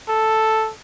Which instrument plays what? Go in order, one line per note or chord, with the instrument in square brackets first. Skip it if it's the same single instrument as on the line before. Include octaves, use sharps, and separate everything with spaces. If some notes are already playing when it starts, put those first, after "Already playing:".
[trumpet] A4